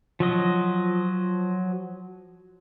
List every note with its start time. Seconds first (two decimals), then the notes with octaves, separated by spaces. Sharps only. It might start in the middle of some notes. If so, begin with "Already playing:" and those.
0.20 F3 F#3 D#5